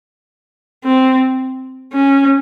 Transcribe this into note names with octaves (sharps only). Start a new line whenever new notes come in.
C4
C#4